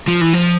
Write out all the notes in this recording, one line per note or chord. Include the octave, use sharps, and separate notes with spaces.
F3
E3
F3